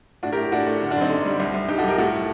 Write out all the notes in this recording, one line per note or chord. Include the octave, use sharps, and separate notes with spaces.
A2 D4 F#4
G4 A#4
A2
A2 D4 F#4
A3
D3
D4 F#4
F#2 C4 D#4
D3
G3
C2
C2
C2 D#4 G4
F#4 A4
C2 G4 A#4
A2 F#4 A4
A3